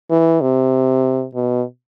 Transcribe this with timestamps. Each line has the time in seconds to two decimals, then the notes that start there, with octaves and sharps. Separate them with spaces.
0.10 E3
0.41 C3
1.35 B2